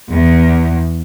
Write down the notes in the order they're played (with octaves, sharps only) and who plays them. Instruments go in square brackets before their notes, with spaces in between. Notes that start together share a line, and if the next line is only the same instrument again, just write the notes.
[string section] E2